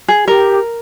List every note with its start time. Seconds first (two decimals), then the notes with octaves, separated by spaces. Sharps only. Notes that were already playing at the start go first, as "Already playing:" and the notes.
0.08 G#4
0.28 G4 A#4